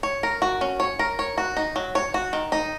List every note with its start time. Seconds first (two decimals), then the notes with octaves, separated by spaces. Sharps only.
0.03 C#5
0.23 A#4
0.42 F#4
0.61 C#4
0.80 C#5
0.99 A#4
1.19 C#5
1.38 F#4
1.57 D#4
1.76 F#3
1.95 C#5
2.14 F#4
2.33 D#3
2.52 D#4